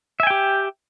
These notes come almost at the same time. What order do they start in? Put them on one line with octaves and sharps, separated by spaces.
E5 G#5 G5 G4